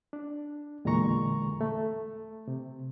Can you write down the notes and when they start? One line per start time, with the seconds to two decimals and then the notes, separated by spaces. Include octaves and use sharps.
0.13 D4
0.85 E2 A#2 D3 G#3 A#5 C#6
1.61 A3
2.48 C3